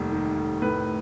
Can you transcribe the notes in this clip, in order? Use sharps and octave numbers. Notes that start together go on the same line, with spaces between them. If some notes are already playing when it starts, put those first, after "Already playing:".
Already playing: F1 D#2 D#3 G3
D#3
F1
A2 B4